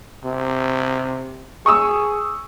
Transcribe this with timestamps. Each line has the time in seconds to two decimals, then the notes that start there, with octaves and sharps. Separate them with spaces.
0.24 C3
1.66 G#4 C#6 D#6 E6